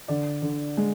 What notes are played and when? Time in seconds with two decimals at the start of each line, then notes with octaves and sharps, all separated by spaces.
0.08 D3 D5
0.42 D3
0.77 G#3